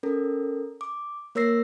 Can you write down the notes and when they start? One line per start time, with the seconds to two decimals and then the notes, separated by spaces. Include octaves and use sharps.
0.03 C#4 A4 A#4
0.81 D6
1.35 A#3 A#4 C#5 E6 A#6 C7